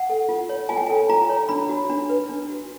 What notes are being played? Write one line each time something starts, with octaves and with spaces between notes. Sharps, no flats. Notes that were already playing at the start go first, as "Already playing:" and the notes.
Already playing: F#5
A4
F4
C#5
F4 G#5
G5
A4 G#5
F4 A#5
C#5
D4 B5
F#4
D4
B4
D4
F#4